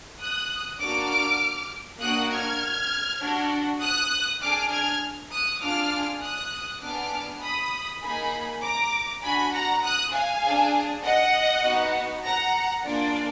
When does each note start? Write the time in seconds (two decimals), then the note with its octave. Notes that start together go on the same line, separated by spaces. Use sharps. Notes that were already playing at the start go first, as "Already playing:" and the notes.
0.19 D#6 F#6
0.80 A#3 D4 F#4 D6 F6
2.00 A#3 D4 F#4 D#6 F#6
2.30 F6 G#6
3.21 D4 F#4
3.81 D#6 F#6
4.41 D4 G#4 D6 F6
4.71 F6 G#6
5.31 D#6 F#6
5.61 D4 F4 G#4 D6 F6
6.21 D#6 F#6
6.82 B3 D4 G#4 D6 F6
7.42 B5 D#6
8.02 A#3 D#4 G#4 G#5 B5
8.63 A#5 D6
9.23 D4 F#4 G#5 B5
9.53 F#5 A#5
9.83 D#6 F#6
10.13 F5 G#5
10.44 D4 G#4
11.04 D#5 F#5
11.64 B3 D#4 F#4
12.24 F#5 A#5
12.85 A#3 D4 F4 G#4 D5